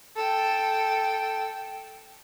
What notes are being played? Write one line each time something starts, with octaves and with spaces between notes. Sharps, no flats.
A4 G5